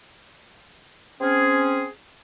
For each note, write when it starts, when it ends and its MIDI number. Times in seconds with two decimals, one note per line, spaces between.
1.21 1.86 60
1.21 1.86 61
1.21 1.86 68